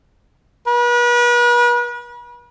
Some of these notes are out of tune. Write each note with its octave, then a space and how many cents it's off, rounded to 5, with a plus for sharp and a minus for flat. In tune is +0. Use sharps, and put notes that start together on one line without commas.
B4 -40